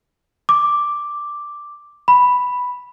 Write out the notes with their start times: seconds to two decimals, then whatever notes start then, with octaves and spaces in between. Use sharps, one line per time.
0.49 D6
2.08 B5